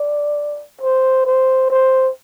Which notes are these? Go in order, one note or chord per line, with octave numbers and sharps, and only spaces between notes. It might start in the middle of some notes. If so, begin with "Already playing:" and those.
Already playing: D5
C5
C5
C5